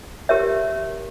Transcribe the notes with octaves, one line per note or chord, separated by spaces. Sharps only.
G4 A#4 C#5 E5